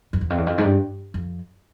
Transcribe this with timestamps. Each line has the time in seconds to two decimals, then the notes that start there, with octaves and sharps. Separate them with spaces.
0.13 F2
0.21 E2
0.30 F2
0.38 E2
0.47 F2
0.58 G#2
0.64 G2
1.14 F2